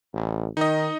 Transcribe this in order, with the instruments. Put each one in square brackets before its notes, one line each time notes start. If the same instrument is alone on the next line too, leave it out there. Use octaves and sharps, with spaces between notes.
[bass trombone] A1
[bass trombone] D#3 [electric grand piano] D#4 D#5